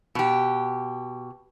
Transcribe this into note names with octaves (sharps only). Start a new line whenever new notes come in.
B2 G4